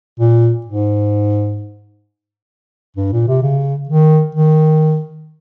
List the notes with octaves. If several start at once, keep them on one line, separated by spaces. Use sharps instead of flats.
A#2
G#2
G2
A#2
C3
C#3
D#3
D#3